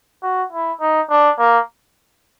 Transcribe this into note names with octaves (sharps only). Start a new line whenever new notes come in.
F#4
E4
D#4
D4
A#3